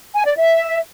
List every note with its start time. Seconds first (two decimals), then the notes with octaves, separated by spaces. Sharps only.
0.14 G#5
0.26 D5
0.37 E5